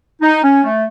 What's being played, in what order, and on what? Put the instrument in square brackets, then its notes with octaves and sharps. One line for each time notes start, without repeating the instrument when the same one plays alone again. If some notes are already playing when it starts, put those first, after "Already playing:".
[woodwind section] D#4
C#4
A3